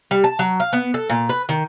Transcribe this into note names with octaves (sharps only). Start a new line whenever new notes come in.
G3
A5
F#3
F5
B3
A4
A#2
B4
D#3